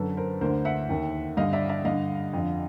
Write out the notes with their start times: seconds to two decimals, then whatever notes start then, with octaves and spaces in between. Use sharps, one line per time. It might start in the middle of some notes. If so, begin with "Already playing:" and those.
Already playing: F#2 D3 A4 B4
0.17 A#4 C5
0.41 D2 D3 A#4 C5
0.65 E5 F#5
0.89 D#2 D#3
1.37 G2 D3 D#5 F5
1.53 D5 E5
1.69 D5 E5
1.85 G2 D3 D#5 F5
2.33 F2 D3